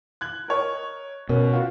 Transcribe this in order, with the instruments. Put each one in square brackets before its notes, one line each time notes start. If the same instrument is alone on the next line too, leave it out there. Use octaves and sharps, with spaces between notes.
[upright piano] F#6 G#6 F#7
A#4 C#5 D#5
[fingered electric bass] B2 [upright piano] C#4 [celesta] A#4
[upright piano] F4 F#4